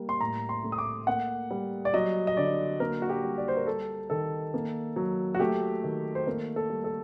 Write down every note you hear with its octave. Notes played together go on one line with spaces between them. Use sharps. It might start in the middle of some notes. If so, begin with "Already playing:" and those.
Already playing: G3 A#3
C6
A2 A#5
C6
A3
D#6
D6
A#3 F#5
G3
D5
F#3 D#5
D#5
D3 D5
A#3 A#4
F#4
G4
G3
D5
C5
A#4
G3 A4
D#3 A4
A#3
F#3
F#4
A3 G4
D#3
C5
A#3 A#4
A4
G3
A4